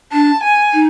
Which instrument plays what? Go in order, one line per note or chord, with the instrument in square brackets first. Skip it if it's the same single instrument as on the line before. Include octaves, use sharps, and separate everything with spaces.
[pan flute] D4 [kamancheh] A5
[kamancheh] G#5
[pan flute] D#4